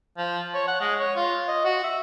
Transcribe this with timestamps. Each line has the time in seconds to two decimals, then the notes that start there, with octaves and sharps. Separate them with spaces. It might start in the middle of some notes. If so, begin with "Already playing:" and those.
0.18 F3
0.54 C#5
0.68 F#5
0.81 G#3
1.00 C#5
1.16 F4
1.48 D#5
1.65 F#4
1.84 E5